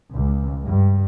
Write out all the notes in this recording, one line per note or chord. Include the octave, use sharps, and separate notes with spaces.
C#2
G2